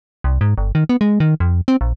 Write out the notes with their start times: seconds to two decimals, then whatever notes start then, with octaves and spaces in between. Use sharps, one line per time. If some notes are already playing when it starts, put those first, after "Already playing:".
0.24 C2
0.41 G#2
0.58 G1
0.75 D#3
0.89 B3
1.01 G#3
1.20 D#3
1.40 F2
1.68 C4
1.81 A#1